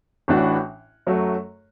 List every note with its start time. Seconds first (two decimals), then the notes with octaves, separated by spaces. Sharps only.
0.28 A1 A2 E3 D4 F#4
1.07 F#2 F#3 A3 F#4